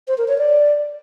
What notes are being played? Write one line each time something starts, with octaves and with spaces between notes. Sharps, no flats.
C5
A#4
C#5
D5